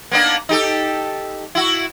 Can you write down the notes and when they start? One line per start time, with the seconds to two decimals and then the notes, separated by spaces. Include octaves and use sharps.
0.11 A#3 B3 D4
0.49 D#4 G4 A4
1.55 E4 F#4